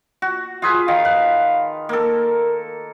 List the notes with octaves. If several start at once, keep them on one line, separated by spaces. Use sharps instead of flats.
F#4
F4 G#4 B4
D#3 F5
B4
A#3 A4 A#4